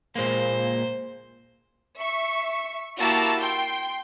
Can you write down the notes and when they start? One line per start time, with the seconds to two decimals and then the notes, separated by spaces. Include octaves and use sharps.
0.16 A#2 G#3 A#3 C5
1.99 E5 C#6
2.98 A#3 E4 F#4 G4 A5 E6
3.39 G5 C6